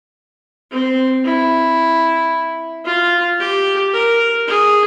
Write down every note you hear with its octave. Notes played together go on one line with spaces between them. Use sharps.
C4
E4
F4
G4
A#4
G#4